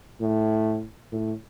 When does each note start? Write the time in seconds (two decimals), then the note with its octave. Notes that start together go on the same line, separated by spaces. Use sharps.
0.21 A2
1.12 A2